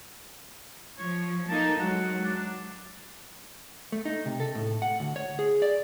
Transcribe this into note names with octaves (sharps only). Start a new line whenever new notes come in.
F3 C#5
A#3 D#4 A4 A5
F#3 G#3 F#5
D4
A3
D#4
C3
A4
A2
F#5
D2
C#5
G#4
D5